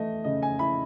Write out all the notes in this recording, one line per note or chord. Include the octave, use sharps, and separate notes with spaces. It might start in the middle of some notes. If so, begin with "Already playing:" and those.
Already playing: E3 A3 D#5
C#3 D#5
G#5
E4 B5